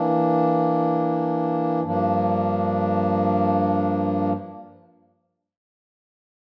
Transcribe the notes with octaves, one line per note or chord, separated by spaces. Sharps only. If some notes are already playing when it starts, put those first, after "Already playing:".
Already playing: E3 A#3 D4
G2 F3 A#3 D4